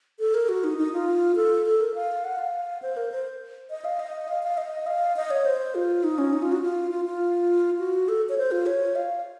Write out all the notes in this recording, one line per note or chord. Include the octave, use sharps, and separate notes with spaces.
A4
A#4
F#4
D#4
D#4
F4
A4
A4
A#4
F5
F#5
F5
C5
A#4
C5
D#5
F5
D#5
F5
F5
D#5
F5
D#5
C#5
C5
F4
D#4
C#4
D#4
F4
F#4
F4
F4
F4
F#4
A4
C#5
C5
F4
C#5
F5